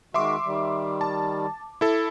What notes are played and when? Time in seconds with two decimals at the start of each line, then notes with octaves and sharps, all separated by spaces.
0.14 D#3 G#3 F#4 E5 C6 D6
0.45 D#3 G3
1.01 A5
1.81 E4 A4